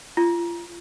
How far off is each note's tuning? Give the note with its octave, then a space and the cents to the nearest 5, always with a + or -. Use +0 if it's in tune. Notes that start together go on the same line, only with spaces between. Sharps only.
F4 -30